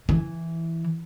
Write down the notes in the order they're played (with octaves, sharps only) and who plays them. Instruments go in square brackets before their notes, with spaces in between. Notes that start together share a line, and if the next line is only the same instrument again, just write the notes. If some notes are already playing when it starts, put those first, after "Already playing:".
[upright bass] E3